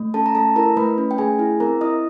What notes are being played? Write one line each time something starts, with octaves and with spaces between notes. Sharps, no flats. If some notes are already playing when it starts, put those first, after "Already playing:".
Already playing: A3
C#4 A4 A5
A#5
A3 A4 A5
E4 A#4 A#5
A3 B4 B5
C#4
G5
A3 G#4 G#5
E4
C4 A#4 A#5
E4 D#5 D#6